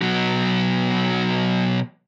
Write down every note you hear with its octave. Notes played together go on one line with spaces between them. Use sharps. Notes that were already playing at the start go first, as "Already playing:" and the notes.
B2 F#3